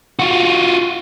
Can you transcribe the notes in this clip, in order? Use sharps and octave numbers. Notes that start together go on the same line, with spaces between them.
F4 F#4